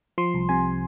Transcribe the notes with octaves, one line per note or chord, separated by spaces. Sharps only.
F3 C6
C2
C3 G#5